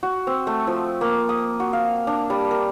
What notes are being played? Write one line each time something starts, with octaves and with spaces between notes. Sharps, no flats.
F#4
C4
A3
F3
A#3
D#6
F#4
F5
D4
G3
A#4